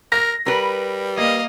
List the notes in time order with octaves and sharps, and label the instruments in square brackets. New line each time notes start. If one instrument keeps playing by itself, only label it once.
[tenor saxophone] A#4 [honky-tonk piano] A#6
[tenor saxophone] G3 [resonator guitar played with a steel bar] A#4 B4
[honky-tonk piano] A#3 [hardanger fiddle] D#5 F5